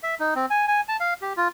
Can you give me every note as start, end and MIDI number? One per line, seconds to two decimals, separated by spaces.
0.03 0.15 76
0.20 0.34 63
0.35 0.46 60
0.50 0.66 80
0.68 0.81 80
0.88 0.97 81
1.00 1.14 77
1.22 1.33 67
1.37 1.48 65